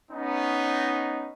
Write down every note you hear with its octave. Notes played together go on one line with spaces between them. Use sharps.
B3 C#4 D#4